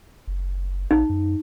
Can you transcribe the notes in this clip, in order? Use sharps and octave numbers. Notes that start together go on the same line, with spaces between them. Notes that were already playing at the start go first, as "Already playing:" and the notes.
F#1
A#1 D#4
F#2